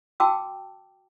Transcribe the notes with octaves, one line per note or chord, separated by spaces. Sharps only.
F#4 G5 A5 D6 E6